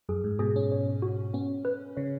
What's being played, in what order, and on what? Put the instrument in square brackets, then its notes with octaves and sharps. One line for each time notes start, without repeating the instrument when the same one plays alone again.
[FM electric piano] F#2 [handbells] G#4
[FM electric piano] G#2
[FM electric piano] B2 [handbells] G#4
[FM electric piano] C#4
[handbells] C#5
F#4
[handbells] B3 [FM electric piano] C#4
[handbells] B4
[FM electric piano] C#3 [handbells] C#5